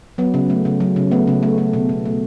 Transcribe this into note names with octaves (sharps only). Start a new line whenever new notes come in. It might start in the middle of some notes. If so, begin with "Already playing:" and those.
F#3 B3
C#3
A3
C#3
F#3
C#3
A3 B3
C#3
A3
A3
B2
B2
A3